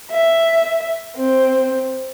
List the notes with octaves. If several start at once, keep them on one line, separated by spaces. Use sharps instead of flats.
E5
C4